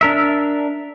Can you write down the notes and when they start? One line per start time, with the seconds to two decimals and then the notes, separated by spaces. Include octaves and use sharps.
0.01 D4 A#4 E5